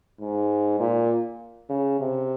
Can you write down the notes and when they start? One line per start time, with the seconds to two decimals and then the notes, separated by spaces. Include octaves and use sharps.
0.20 G#2
0.80 A#2
1.69 C#3
2.00 C3